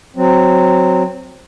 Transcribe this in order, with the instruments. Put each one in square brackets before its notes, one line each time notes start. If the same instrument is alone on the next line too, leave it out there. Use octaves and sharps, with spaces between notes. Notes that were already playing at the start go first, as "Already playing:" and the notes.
[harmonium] F#3 C4